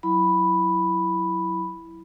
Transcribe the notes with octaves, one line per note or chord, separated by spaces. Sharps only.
F#3 E4 B5